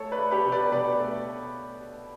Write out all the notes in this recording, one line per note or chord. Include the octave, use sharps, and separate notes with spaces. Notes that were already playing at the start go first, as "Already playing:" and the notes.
Already playing: A3 A4 C#5
B4 D5
A3
G4 B4
B2
B4 D5
B2 B4 D5
A3